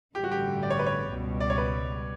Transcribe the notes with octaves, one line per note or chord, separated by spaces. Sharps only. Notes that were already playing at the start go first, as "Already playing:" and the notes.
A1 G2 D3 G3 G4
F#4
G4
D5
C#5
B4
C#5
C#2 B2 G3
D5
C#5
B4